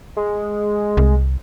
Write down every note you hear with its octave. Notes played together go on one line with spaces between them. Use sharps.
G#3
C2